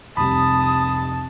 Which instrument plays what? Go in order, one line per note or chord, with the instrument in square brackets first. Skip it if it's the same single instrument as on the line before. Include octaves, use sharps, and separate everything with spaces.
[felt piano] F1 C2 [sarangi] A5 [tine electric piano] B5 [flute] D#6